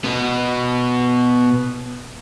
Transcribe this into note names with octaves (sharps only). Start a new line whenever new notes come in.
B2 B3